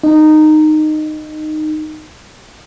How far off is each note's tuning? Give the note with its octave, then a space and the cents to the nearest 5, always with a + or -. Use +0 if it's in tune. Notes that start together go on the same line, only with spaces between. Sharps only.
D#4 -15